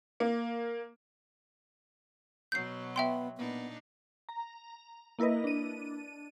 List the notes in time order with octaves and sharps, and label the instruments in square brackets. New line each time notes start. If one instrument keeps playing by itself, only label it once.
[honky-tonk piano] A#3
[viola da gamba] B2 F#3 [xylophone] G6 C7
[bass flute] B3 [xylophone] E5 G5 C6
[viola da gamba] A#2 D4 D#4 [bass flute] B3
[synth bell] A#5
A#3 E4 A#4 B4 D#5
D4 D#7